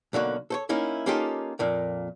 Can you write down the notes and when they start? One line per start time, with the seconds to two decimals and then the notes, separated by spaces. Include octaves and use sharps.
0.13 B1 D3 A#3 F#4
0.50 A4 C5 C#5
0.69 A#3 C#4 D#4 E4
1.06 A#3 C#4 D#4 F4 G4 A4
1.59 F2 A#2 A#3